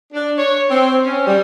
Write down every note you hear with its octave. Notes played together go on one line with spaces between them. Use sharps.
D4
C#5
C4
C#4
G3